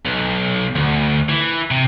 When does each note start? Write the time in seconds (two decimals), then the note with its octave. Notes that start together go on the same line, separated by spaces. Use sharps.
0.05 B1
0.76 D2
1.29 E3
1.71 C3